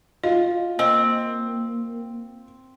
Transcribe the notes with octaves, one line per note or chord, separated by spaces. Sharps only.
F4 D#5
A#3 C4 D#5